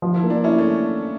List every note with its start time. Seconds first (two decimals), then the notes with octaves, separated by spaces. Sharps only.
0.02 F3
0.16 E4
0.23 A#3
0.30 D4
0.44 C#4 E4
0.58 A3